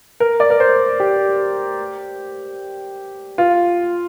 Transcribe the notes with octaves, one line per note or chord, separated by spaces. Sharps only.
A#4
D5
A#4
C5
G4
F4